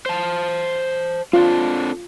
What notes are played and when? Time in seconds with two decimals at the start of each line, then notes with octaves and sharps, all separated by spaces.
0.06 C5 A5
1.33 C4 D4 F4 A4